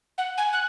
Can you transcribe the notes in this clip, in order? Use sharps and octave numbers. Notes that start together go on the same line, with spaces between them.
F#5
G#5
F#6